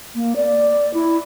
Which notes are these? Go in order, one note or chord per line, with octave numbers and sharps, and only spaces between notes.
A#3
D5
E4